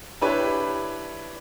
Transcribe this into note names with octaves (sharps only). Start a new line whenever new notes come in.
D4 E4 G4 B4 C#5